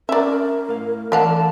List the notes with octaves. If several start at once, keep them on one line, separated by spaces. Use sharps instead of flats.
C#4 A#4 D5 E5 A#5
A2 F5
E3 A#3 A4 D5 F5 F#5 A5